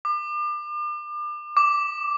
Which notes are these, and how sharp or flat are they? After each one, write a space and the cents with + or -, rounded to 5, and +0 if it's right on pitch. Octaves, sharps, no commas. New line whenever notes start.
D6 +35
D6 -5